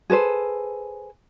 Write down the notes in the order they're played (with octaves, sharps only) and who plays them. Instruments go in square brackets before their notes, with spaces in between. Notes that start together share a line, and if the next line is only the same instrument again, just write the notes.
[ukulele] G#4 A4 B4 C5